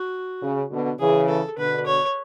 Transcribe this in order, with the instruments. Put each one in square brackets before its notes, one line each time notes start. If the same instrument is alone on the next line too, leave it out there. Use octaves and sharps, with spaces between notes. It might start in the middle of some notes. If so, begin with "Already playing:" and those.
Already playing: [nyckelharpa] F#4
[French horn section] C#3
B2 D3
[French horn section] C#3 E3 [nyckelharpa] G#4
[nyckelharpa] A4
[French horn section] B2 D3 [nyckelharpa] B4
[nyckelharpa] C#5